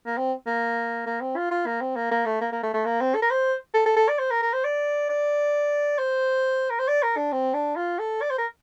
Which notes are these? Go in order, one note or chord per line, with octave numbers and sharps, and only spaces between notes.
A#3
C4
A#3
A#3
C4
F4
F4
A#3
C4
A#3
A#3
A3
A#3
A#3
A3
A3
A#3
C4
A4
A#4
C5
A4
A4
A4
D5
C5
A#4
A#4
C5
D5
D5
C5
A#4
C5
D5
A#4
D4
C4
D4
F4
A4
D5
C5
A#4